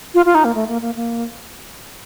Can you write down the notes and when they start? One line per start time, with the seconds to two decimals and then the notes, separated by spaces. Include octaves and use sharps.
0.14 F4
0.26 F4
0.35 D#4
0.45 A#3
0.55 A3
0.68 A#3
0.81 A#3
0.96 A#3